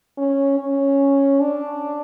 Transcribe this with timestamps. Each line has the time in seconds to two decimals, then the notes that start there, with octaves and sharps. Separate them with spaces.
0.18 C#4
0.59 C#4
1.41 D4